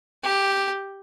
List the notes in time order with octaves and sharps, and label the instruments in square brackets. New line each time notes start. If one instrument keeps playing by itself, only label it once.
[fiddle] G4